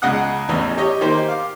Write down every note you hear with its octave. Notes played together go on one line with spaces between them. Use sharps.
C#2 C#3 D#5 F#5 D#6 F#6
A1 E2 E3 C#4 D#5
G4 C#5 D#5
D#3 A#3 D#4 G4 C5
F5 D6